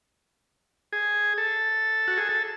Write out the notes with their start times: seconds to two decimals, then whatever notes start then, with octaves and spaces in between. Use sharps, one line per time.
0.93 G#4
1.38 A4
2.08 F#4
2.17 G#4
2.29 A4